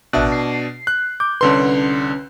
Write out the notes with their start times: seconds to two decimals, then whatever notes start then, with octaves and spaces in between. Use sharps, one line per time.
0.13 A1 B2 D4 E5 F#6
0.32 C7
0.87 F#6
1.20 D6 G6
1.41 C2 D3 C#4 B4 C6